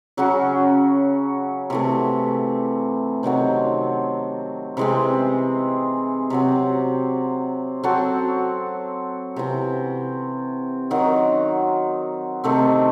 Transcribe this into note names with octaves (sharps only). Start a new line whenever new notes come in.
C#3 F#3 C#4 F#4
C3 E3 A3
C3 D#3 F#3 C4
C3 E3 G#3 C4
C3 F#3 C4
F#3 C4 F#4 A4
C3 E3 C4
D#3 F#3 C4 F#4
C3 D#3 A3 C4